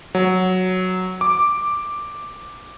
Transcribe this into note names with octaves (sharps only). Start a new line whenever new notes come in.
F#3
D6